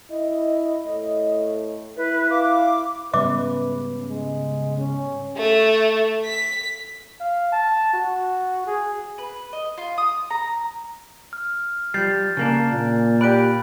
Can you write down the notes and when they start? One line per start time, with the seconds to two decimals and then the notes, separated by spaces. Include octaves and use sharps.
0.10 E4 D#5
0.86 A2
1.97 E4 B4
2.30 F5 D6
3.14 G#2 C#3 G3 B3 B4 E5 D6
4.09 G#3
4.78 C#4
5.38 A3
6.25 B6
7.20 F5
7.52 A5
7.93 F#4
8.67 G#4
9.18 B4
9.53 D#5
9.77 F4
9.98 D#6
10.30 A#5
11.33 F6
11.94 F3 G3 G6 A6 C7
12.37 C#3 A#3 D4
12.72 A#2
13.21 G4 D5 B5 F#6 D7